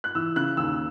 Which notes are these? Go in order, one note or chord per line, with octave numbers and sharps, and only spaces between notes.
F#6
E3 E6
C#3 F#6
D#2 E6